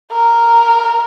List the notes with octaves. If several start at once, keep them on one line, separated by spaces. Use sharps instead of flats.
A#4